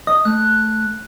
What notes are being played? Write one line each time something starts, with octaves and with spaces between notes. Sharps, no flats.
D#5 D#6
A3 F#6